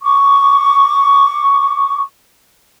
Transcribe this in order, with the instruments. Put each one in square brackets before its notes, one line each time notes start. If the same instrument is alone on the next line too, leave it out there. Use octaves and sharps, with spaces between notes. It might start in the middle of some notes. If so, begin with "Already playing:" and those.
[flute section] C#6 D6